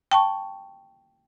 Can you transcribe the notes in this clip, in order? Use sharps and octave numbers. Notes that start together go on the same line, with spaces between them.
G5 A5 C#6